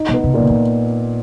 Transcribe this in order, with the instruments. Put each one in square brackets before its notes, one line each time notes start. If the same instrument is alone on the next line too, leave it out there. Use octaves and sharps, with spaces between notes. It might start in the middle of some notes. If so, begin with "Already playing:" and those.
Already playing: [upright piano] D#4
[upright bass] B2
[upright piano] B3
[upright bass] C3
[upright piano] A#2
[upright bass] C#3
D#3